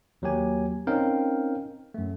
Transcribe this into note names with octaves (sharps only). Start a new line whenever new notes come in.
D#2 F#3 A#3 G4 G#5
C4 C#4 D#4 A#4 F5 G5
F#2 A3